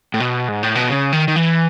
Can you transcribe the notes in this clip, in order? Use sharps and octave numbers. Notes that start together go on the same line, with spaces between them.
A2
B2
G#2
A2
B2
C#3
D#3
D#3
E3